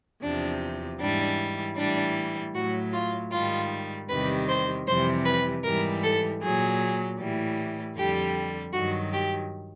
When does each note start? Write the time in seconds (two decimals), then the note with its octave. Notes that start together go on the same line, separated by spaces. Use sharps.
0.23 E2 C3 F3 D4
1.00 G#2 E3 G3 D4
1.77 A2 E3 G3 D4
2.55 A2 F#3 F#4
2.93 F4
3.31 G#2 D#3 G3 F4
4.09 E2 C3 D#3 G3 B4
4.48 C5
4.87 F2 C3 E3 G3 C5
5.25 B4
5.63 G#2 E3 G3 A#4
6.03 A4
6.42 A#2 F#3 G#4
7.18 A2 E3 G3
7.96 F2 D3 G3 G4
8.73 G2 D#3 F#3 F#4
9.13 G4